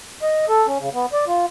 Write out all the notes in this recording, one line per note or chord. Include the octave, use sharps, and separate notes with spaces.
D#5
A4
C#4
C#3
B3
D5
F4